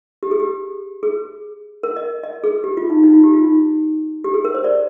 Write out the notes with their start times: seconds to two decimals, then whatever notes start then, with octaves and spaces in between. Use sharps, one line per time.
0.23 G4
0.31 G#4
0.40 G4
1.03 G#4
1.83 A#4
1.96 D#5
2.23 D#5
2.44 G#4
2.64 G4
2.77 F4
2.90 D#4
3.03 D#4
3.14 F4
3.24 G4
3.34 F4
3.44 D#4
4.24 G4
4.34 G#4
4.45 A#4
4.54 C5
4.64 D5